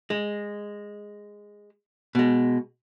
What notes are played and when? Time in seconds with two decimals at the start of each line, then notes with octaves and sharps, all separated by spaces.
0.10 G#3
2.15 B2 G#3